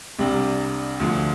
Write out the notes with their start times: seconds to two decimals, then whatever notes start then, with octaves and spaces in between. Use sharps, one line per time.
0.19 C2 C3 G3 D4
1.00 D2 D3 F3